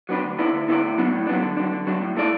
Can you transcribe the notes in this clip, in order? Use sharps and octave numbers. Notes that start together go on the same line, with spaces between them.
F#3 B3 D4 B4
D2
D3 B3 E4 D5
D2
D3 B3 E4 D5
A2
F#3 B3 D4
A2
F#3 B3 D4
D3
F#3 D4
D3
F#3 D4
A2
A3 E4 A4 D5